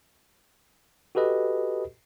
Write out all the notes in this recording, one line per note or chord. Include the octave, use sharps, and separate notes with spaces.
F#4 G4 A4 B4 D#5